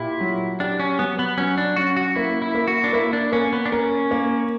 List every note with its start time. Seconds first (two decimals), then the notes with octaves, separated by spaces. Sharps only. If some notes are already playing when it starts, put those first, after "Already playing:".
Already playing: A#2 E4 G4
0.20 F#3
0.60 D4 G4
0.80 C#4
0.99 F#3 B3
1.19 B3
1.37 F#3 C#4
1.58 D4
1.76 C#4 F#4
1.97 F#4
2.16 A#3 E4
2.42 E4
2.55 A#3
2.67 F#4
2.84 D4
2.93 A#3 E4
3.13 D4
3.32 A#3 C#4
3.53 B3
3.66 D4
3.72 C#4 A#4
4.11 A#3